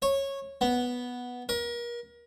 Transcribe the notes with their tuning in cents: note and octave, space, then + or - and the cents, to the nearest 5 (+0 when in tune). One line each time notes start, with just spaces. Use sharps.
C#5 -15
B3 -5
A#4 +35